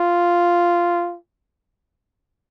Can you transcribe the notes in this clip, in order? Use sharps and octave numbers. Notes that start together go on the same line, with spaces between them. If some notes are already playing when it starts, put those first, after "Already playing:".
Already playing: F4